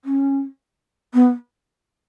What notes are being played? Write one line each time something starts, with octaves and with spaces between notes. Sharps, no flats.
C#4
B3